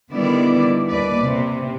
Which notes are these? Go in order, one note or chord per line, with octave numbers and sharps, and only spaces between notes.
D3 D#3 G3 B3 E4 D5
D#2 B4 D5
C3